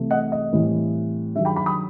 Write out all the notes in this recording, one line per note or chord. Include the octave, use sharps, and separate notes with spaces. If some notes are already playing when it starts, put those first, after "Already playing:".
Already playing: C2 C3 E3 A3
D#5 F#5
D#5
A2 E3 G3 C4
G2 D#3 F#3 E5
G5 B5
G5 B5
B5 D#6